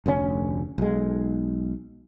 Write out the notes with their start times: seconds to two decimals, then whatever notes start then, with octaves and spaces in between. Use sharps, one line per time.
0.06 F1 D2 B2 C#4
0.78 B1 G#3